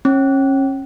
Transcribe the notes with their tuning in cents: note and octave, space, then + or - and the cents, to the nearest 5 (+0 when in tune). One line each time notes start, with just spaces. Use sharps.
C#4 -30